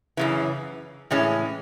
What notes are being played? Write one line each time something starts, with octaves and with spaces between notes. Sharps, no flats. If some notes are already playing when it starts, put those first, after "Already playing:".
F#2 C#3 E3
A2 E3 G#3 C#4